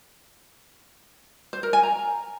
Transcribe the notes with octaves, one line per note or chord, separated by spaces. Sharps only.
C5
A#4
G#5
A#5